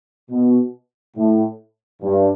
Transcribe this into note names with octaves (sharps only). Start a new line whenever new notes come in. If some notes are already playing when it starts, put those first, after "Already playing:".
B2
A2
G2